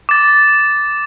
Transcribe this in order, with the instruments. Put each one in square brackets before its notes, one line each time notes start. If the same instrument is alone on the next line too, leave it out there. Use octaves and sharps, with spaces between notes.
[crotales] D6 A6